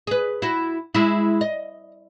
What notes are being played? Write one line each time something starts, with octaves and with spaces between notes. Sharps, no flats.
G#4 B4
E4 F#4
G#3 E4
D#5